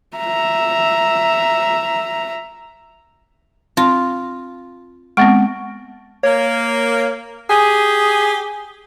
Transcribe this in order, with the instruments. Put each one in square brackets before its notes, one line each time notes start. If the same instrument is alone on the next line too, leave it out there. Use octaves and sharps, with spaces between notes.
[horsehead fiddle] E5 A#5
[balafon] C4 [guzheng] F4
[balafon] G#3 B3 C4 [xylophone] F#5 C#6 D7
[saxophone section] A#3 [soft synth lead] C#5
[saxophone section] G4 G#4 [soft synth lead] G#5